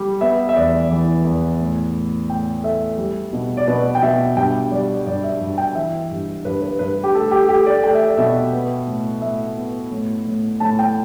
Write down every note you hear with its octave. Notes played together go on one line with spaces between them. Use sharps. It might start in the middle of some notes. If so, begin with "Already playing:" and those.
Already playing: G3
B3 E5
E5
E2 D5
E3
E2
A2
A2
A2 G5
A3 E5
G3
B2
D5
B2 B4
G5
B2 E5
G2 G5
G3 D5
G2 D5
E5
G2
G5
E3 E5
G2
G2 B4
B4
G2 B4
G4
A3 A4
G4
A3 G4
D5
A3 G5
E5
D5
B2 E5
B3
A2
A2 E5
B3
A2
A2
A2 A5
G5